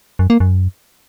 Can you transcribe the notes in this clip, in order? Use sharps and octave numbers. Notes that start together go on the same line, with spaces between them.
F#2
A#3
F#2